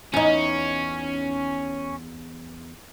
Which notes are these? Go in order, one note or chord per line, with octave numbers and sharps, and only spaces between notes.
E2 C#4 D#4